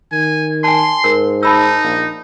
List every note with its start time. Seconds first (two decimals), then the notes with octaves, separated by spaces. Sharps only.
0.12 D#3 G#5
0.64 G#5 A5 C6
1.04 G#2 A#4
1.43 D#4 A5 B5 E6
1.84 A#1